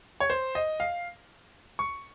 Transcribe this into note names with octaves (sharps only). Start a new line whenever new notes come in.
C#5
C5
D#5
F5
C#6